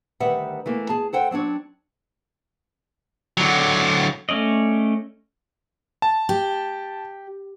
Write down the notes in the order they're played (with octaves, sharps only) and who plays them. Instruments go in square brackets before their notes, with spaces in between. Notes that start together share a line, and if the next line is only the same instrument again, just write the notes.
[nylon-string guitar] D2 D#3 G3 B4 E5 F#5
E3 A3 A#3
G#4 A5
A4 C5 F#5 G5
F#3 C4 D4 C#5
[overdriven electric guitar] D3 F#3
[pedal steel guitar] A3 C#4 D5 D#5
[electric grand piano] A5
[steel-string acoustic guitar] G4